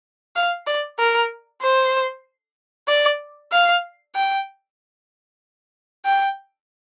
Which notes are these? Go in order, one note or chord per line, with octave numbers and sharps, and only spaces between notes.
F5
D5
A#4
C5
D5
F5
G5
G5